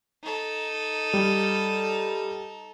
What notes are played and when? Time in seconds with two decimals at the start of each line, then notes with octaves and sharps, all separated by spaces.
0.23 D#4 A4
1.14 G3